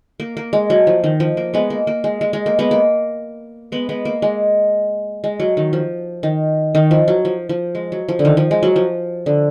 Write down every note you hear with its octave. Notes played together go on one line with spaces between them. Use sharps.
A#3
A#3
G#3
F#3
F3
D#3
F3
A#3
G#3 B3
A#3
A#3
G#3
G#3
G#3
A#3
G#3 B3
A#3
G#3 B3
G#3 B3
A#3
G#3
G#3
F#3
D#3
F3
D#3
D#3
F3
F#3
F3
F3
G#3
F#3
F3
D3
D#3
F3
G#3
F#3
F3
D3